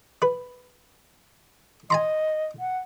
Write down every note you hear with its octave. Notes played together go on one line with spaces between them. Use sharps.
B4
D#5 G#5 A#5 C6
F#5